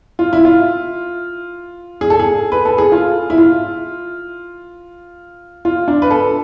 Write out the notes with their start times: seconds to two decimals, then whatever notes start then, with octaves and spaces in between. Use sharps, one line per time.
0.19 F4
0.33 E4
0.45 F4
2.01 G#4
2.10 A4
2.19 G#4
2.52 B4
2.65 A4
2.78 G#4
2.92 F4
3.30 E4
3.38 F4
5.65 F4
5.88 D4
6.02 B4
6.11 A4